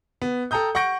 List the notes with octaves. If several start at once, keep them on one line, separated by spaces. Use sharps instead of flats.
B3
A4 G5 A#5 D#6 G6
F#5 C#6 G6 A#6 D7